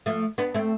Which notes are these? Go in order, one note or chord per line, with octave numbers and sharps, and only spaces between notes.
F3 A3
B3 D4
A3 C4